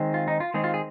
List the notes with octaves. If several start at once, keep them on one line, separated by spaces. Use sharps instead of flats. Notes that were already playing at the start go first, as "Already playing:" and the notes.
Already playing: D#3 G#3 C4
F4
D#4
F4
D#3 G#3 C4 G#4
F4
G#4